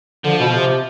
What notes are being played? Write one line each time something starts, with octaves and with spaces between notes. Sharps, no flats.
D3 F3
B2
C3